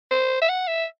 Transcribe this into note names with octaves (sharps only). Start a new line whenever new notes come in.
C5
E5
F#5
E5